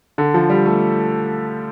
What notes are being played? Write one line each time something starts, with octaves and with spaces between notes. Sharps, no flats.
D3
F3
G3
A3